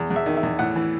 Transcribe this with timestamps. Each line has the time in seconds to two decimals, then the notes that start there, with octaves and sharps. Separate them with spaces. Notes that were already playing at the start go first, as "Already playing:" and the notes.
Already playing: E2
0.10 E2
0.16 E5
0.26 D#3
0.37 E5
0.43 E2
0.59 A2 F#5
0.76 E3